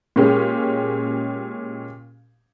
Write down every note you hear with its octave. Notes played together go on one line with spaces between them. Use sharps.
A#2 G#3 C#4 G4